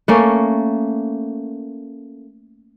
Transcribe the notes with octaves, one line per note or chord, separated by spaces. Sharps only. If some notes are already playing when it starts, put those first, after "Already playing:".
A3 A#3 C#4